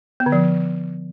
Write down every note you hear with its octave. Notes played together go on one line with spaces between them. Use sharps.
B3
D3
F3